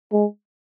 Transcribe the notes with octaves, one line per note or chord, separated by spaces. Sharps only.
G#3